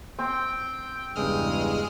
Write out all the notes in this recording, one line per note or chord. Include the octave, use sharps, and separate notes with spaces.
C4 G5
E2 G2 C#3 G#3 D#6 F6